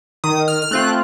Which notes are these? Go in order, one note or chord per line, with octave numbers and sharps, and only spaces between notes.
D#3 D#6
F6
F6
A3 C4 F4 F#6